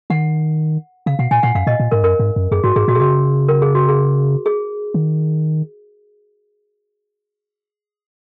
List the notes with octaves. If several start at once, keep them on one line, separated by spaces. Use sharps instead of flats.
D#3 F#5
C#3 F5
B2 F#5
A#2 G#5
A#2 F#5
F#2 F5
A#2 D#5
A#2
G#2 A#4
F#2 A#4
G#2
F#2
F#2 G#4
G#2 F#4
G#2 G#4
A#2 F#4
B2 G#4
C#3 F#4
A#4
G#4
F#4
G#4
G#4
D#3